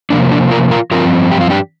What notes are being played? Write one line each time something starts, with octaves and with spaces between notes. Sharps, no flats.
C3 F3 A#3 D4
D4
F4 A#4
F4 A#4
G2 F3 C4 F4 A#4
G4
F4
D4 G4